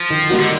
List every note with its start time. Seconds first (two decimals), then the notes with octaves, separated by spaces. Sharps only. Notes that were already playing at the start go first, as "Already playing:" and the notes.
Already playing: F3
0.10 D#3
0.30 G3 A#3 D#4 F#4
0.39 D3